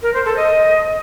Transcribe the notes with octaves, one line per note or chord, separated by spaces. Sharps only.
A#4
C5
A4
D#5